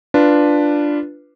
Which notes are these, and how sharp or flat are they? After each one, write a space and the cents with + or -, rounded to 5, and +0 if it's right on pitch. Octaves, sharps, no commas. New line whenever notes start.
D4 +0 F4 -10 B4 +0